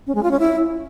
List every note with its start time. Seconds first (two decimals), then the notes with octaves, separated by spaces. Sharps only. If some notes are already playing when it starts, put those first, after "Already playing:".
0.07 C#4
0.15 G#3
0.23 F4
0.31 C#4
0.39 E4